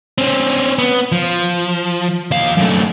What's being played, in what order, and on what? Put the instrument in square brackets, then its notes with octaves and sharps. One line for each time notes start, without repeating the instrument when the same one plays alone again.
[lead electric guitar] C4 C#4
B3
F3
D#2 F5
F#2 A3